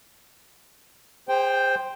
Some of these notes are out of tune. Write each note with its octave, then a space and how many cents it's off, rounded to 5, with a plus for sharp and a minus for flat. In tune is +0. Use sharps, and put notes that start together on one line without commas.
G#4 -40 C5 +0 G5 +0